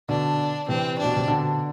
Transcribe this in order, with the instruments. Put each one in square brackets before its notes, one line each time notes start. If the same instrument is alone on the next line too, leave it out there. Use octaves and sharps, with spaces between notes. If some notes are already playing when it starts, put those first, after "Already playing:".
[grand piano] B2 D3 [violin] D4
[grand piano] C3 E3 [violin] C4
[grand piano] B2 [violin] D4
[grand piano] C3
B2 D3